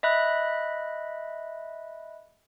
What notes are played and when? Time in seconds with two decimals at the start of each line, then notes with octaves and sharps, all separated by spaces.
0.03 D#5 E5 B5 F#6